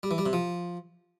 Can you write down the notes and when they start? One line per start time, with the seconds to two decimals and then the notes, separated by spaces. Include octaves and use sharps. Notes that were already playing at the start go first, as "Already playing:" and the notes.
0.03 G3
0.11 E3
0.18 G3
0.26 C3
0.33 F3